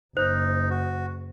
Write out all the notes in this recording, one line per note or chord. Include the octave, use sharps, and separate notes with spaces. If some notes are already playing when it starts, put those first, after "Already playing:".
F#1 D#4 C5
F#4